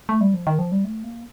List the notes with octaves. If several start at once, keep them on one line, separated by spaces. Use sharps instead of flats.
A3
G3
F3
D#3
F3
G3
A3
A#3